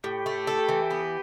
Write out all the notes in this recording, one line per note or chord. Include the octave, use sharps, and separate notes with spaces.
A2 G4
A3
A4
E3
B3